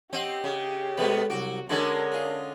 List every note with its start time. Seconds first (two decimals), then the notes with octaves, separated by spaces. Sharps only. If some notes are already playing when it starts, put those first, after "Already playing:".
0.13 C4 G4 D#5 F#5 C6
0.44 C#3
0.97 B2 G#3 A3 B3 B4
1.30 C2 F#3 F#4 D6
1.69 D3 G#3 C#4 F#4 A#4 F#5
2.12 F4 G#4